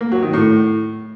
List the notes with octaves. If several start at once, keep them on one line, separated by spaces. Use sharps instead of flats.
A#3
F#3
D#3
A2